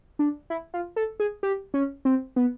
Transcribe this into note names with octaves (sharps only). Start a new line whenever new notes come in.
D4
E4
F4
A4
G#4
G4
C#4
C4
B3